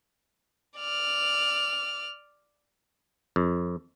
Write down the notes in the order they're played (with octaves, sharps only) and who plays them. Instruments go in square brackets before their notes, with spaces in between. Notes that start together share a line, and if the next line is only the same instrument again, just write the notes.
[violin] D5 F6
[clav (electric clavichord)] F2